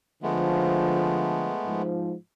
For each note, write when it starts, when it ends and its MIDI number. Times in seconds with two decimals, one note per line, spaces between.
0.23 1.52 50
0.23 1.52 53
0.23 1.82 56
0.23 1.82 57
0.23 1.82 59
1.66 2.14 44
1.66 2.14 53